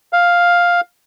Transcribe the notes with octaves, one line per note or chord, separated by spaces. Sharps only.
F5